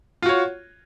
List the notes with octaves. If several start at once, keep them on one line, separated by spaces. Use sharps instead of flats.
F4 F#4 C#5